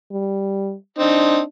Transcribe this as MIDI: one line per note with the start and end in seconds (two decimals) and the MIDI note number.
0.12 0.75 55
0.98 1.39 60
0.98 1.44 62
0.98 1.39 63